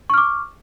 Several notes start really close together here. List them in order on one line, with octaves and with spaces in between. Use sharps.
C#6 F6 D6